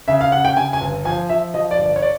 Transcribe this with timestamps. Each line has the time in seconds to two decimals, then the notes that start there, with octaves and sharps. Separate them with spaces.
0.08 C#3 E5
0.21 F5
0.32 C#3 F#5
0.45 G5
0.56 C#3 G#5
0.73 G#5
0.81 G1
1.05 F3 G#5
1.29 F3 E5
1.54 F3 D#5
1.71 D5
1.78 G1
1.86 D5
1.96 C#5
2.02 D5